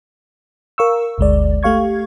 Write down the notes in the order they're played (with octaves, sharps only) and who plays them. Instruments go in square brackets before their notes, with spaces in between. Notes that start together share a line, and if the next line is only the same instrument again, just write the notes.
[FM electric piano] A#4 F5 C#6 E6
G1 D2 G#3 D5
A3 G4 F5 C#6 G#6